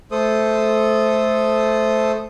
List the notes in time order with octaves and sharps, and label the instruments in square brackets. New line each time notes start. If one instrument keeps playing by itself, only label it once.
[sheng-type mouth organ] A3 A4 C5 D#6